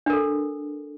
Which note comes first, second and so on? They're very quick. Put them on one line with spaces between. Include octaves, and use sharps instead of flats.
D4 A#4 A4